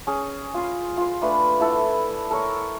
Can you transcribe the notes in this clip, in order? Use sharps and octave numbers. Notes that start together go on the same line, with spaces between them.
C#4 G#4
F4 G#5 C6
F4 C6
A3 D4 B4
E4 A4 F#5
A4 A#4 C#5 C#6